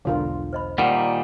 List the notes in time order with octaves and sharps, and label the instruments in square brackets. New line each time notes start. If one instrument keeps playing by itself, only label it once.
[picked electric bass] E1 B1 [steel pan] D3 F4 A#4
[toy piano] C5 D#5 B5
[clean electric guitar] A#2 D#3 G3 [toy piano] F#5